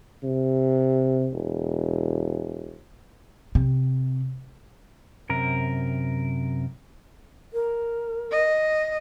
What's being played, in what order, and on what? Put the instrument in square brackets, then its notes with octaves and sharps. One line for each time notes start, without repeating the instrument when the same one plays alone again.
[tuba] C3
E1
[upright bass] C3
[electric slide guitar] F#2 C3 A#4
[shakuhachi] A#4
[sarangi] D#5